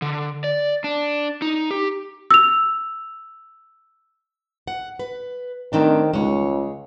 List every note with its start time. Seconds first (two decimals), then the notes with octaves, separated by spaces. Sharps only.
0.02 D3
0.44 D5
0.84 D4
1.42 D#4
1.71 G4
2.31 E6 F7
4.68 F#5
4.99 B4
5.73 D#3 A3 C4 D4
6.13 C#2 G#3 C#5